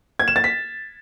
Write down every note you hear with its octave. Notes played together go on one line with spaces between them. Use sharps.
G#6
E7
A6
B6